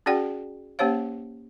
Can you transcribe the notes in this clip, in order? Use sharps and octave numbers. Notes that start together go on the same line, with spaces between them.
C#4 F#4 G#4 D5 F#5 G5
A#3 C#4 G4 C5 C#5 F5